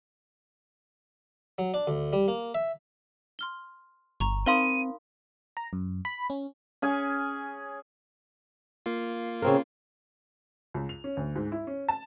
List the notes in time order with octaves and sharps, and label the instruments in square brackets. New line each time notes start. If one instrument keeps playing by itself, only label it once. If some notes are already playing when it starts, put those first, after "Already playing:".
[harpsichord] F#3
D4
D2
G3
A#3
E5
[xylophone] C6 F6 G7
[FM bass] G1 [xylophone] A#5 C#6
[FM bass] C4 [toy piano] D#4 F5 C6 [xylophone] A#4 B5 D#6 [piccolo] D#7
[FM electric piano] A#5
F#2
B5
C#4
[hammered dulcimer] C#4 G#4 G#5
[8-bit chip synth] A#3 F4
[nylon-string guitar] C#3 C4 A#4
[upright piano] C#2
F7
C#4
D2
G#2
E4
C#4
A5